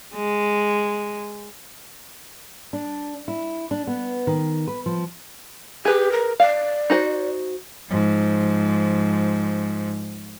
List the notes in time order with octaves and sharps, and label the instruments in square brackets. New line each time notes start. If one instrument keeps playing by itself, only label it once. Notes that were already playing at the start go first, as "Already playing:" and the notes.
[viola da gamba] G#3
[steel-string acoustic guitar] D4
E4
D4
B3
D#3
B4
F3
[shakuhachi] G4 [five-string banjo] G#4 B4
[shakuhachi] A#4
[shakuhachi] D5 [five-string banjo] F5
[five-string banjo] D#4 F#4 C5
[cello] G#2 F3